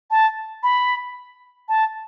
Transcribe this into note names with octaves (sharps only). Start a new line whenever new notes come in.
A5
B5
A5